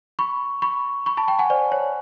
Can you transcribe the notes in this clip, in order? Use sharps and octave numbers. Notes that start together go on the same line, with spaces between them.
B5 C#6
B5 C#6
B5 C#6
A5 B5
G5 A5
F#5 G#5
C5 D5
C#5